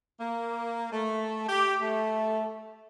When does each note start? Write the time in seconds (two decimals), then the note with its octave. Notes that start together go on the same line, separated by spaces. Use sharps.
0.19 A#3
0.92 A3
1.48 G4
1.82 A3